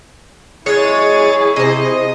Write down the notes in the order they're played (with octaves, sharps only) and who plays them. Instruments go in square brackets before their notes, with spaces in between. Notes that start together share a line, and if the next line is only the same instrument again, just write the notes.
[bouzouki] F#3 G#3 [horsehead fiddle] E4 G#4 [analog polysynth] C#5 A6 D#7
[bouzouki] C3 C5 [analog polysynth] D#5